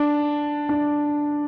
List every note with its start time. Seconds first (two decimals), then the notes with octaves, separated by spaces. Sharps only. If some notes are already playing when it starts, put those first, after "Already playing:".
Already playing: D4
0.69 D4